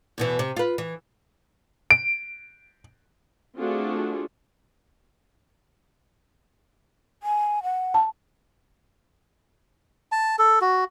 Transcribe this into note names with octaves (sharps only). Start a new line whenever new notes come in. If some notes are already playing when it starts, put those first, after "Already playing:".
E2 B2 E3
C3
F4 B4
E3
D7
A3 C4 D4 F4 F#4 G#4
G#5
F#5
A5
A5
A4
F#4